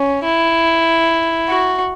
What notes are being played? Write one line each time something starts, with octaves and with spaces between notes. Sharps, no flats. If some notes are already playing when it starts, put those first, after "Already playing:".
Already playing: C#4
E4
F#4